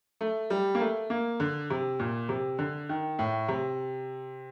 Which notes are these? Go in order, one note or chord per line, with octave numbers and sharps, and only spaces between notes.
A3
G3
A#3
A3
A#3
D3
C3
A#2
C3
D3
D#3
A2
C3